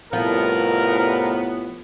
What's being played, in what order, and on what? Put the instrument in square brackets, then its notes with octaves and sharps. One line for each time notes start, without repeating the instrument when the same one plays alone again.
[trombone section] C2 A2 [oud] F3 [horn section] B3 [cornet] A#4